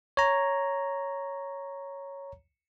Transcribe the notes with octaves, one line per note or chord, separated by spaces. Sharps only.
C#5 A#5